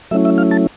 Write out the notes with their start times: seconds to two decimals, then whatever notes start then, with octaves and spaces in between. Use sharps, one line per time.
0.11 F#3 A3 C#4 E4 E5
0.25 E5
0.38 F5
0.51 A5